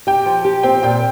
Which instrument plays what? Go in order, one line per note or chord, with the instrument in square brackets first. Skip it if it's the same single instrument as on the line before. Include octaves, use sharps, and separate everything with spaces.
[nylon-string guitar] G4 [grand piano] G5
[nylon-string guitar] F3
G4
[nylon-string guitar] C4 [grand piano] G5
[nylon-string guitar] A#2 [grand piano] G5